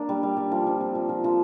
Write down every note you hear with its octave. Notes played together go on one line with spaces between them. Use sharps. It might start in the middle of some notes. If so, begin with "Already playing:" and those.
Already playing: A#3 D4
G3
G3
G3
F3
F3
C4
F3
F3
F3